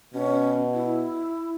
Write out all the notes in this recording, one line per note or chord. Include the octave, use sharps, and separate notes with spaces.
B2 C#4
E4